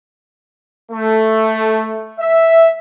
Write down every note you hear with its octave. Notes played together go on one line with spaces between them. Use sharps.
A3
E5